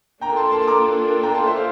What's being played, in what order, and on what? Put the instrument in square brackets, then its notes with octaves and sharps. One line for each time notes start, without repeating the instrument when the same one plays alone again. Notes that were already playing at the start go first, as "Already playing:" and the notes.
[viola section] A#3 D4 F4 A4 [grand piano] G5 A#5
[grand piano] A5 C6
A5 C6
C6
A#5 D6
G5 A#5
A5 C6
C5 E5
F5